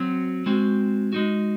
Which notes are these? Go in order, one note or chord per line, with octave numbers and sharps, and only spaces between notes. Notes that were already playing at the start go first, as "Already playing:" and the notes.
Already playing: F#3 C4 F#4
G#3 C4 F#4
G#3 D#4 F#4